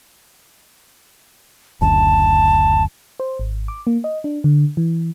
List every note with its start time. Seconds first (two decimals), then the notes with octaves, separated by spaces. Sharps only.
1.81 F#1 D2 A5
3.20 C5
3.39 G#1
3.68 D6
3.87 A#3
4.04 D#5
4.24 D4
4.44 D3
4.77 E3